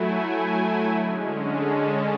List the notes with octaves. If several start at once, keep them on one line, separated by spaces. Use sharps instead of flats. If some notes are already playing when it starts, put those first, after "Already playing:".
Already playing: F#3 A3 E4 G#5
D3 G#3 C#4
A5
A5